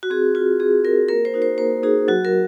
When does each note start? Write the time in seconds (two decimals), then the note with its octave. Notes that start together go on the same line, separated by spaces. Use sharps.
0.03 F#4
0.10 C4 G#4
0.35 F4 F#4
0.60 C4 G#4
0.85 F4 A#4
1.08 A#3 A#4
1.25 C5
1.34 D#4 F#4
1.42 C5
1.58 A#3 C5
1.83 D#4 F#4 G#4
2.08 F#3 F#4
2.25 A#4